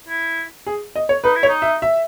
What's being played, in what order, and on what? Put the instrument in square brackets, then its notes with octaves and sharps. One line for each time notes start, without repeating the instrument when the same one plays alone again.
[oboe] E4
[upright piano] G#4
D#5
C#5
[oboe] D#4 [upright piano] B4
[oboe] E4
[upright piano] C#5
[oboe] D#4
[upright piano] E5
E5